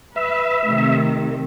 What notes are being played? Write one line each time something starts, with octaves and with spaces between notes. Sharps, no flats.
B4 E5
C3 D#3 A3